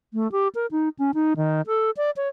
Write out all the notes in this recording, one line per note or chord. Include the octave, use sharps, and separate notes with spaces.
A3
G4
A#4
D#4
C#4
D#4
D#3
A4
D5
C#5